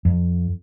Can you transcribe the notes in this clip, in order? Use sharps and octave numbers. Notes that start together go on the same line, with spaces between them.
F2